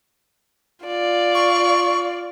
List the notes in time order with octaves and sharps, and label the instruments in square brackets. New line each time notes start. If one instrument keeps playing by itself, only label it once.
[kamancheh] F4 D5
[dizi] C#6